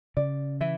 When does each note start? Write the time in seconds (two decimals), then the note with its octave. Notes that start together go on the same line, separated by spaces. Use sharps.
0.17 C#3 D5
0.61 E3 E5